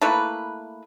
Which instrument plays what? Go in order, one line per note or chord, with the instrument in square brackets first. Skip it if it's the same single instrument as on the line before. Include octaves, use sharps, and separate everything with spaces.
[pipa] A3 A#3 E4 B4